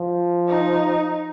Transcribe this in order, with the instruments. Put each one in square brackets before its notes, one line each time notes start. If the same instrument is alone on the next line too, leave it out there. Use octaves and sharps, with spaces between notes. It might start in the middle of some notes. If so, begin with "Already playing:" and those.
Already playing: [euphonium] F3
[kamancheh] D#4